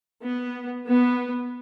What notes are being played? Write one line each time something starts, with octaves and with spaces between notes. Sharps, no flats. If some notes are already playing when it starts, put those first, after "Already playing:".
B3
B3